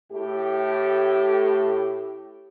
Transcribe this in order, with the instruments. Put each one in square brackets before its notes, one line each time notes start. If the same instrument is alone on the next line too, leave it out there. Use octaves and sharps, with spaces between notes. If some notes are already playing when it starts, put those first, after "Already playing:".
[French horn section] A2 G4